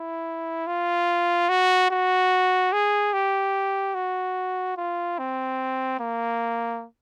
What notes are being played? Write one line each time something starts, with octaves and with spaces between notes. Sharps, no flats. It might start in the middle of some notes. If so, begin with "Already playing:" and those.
Already playing: E4
F4
F#4
F#4
G#4
G4
F#4
F4
C4
A#3